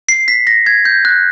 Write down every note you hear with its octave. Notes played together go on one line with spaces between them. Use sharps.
C7
B6
A#6
G#6
G6
F#6